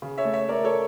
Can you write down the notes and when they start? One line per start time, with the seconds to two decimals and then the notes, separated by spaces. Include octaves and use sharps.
0.02 C#3
0.18 C#5 E5
0.25 A3
0.33 C#5 E5
0.49 A3 A#4 D5
0.64 A4 C#5